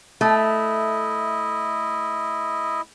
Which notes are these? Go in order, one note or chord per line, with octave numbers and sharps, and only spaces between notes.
A3 E4 D#5